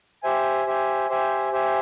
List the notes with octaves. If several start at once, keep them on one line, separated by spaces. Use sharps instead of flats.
G4 C5 E5 G#5
G4 C5 E5 G#5
G4 C5 E5 G#5
G4 C5 E5 G#5